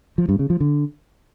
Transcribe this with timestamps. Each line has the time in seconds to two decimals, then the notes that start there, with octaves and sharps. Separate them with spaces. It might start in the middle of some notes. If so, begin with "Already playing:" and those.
0.18 F3
0.29 G2
0.39 C#3
0.50 F3
0.60 D3